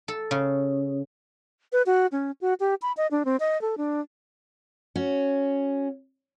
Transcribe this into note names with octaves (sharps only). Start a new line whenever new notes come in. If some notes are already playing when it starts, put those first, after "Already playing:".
A4
C#3
B4
F#4
C#4
F#4
G4
B5
D#5
D4
C4
D#5
A4
D4
C#4 F#4